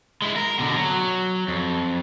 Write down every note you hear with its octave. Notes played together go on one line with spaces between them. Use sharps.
G#3 E4
A#4
B2 D3
F#3
F2